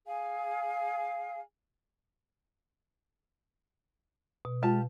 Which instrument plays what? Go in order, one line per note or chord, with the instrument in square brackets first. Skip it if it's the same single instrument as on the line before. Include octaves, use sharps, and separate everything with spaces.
[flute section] G#4 F5 G#5
[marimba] B2
[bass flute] G#3 [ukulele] F4 G4 A5